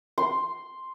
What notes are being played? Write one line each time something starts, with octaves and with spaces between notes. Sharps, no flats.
C6